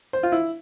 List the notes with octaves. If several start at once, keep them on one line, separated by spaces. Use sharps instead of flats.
C5
F4
E4